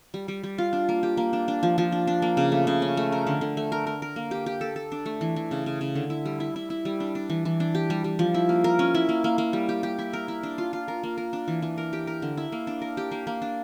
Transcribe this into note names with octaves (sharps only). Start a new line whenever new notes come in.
G3
G3
G3
F4
D4
A#3
G4
A#3
D4
D4
F3
F3
D4
D4
A#3
C#3
A3
C#3
C#4
A3
A#4
D3
D3
A3
A#4
A#4
A#4
A#3
G4
G4
A4
A4
D4
A3
E3
E3
C#3
C#3
C#3
D3
E4
G3
E4
E4
E4
G3
D4
D4
E3
E3
D4
G4
G3
G3
F3
E4
A#3
A#4
C#4
E4
A#3
A#3
A#3
G3
G4
G4
E4
A#4
E4
D4
F4
F4
A#4
A#3
A#4
D4
E3
E3
A#4
G4
A#4
D3
E4
A#3
D4
A#4
G4
A#3
A#3
D4